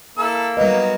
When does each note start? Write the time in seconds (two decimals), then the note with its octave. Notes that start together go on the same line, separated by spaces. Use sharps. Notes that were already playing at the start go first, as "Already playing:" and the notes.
0.18 A#3 E4 A4 E6
0.57 F#3 G3 B3 A#4 D#5